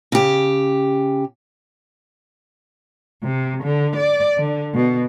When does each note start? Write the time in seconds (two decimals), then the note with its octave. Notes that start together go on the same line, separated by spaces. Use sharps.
0.12 C#3 G4
3.23 C3
3.63 D3
3.96 D5
4.38 D3
4.75 B2